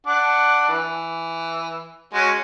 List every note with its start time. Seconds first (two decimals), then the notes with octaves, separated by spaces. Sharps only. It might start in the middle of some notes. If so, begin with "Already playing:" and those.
0.06 D4 F#5 D6
0.69 E3
2.14 G#3 C#4 F#4